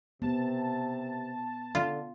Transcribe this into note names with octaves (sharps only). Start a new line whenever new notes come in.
C3 B3 A5
D3 F4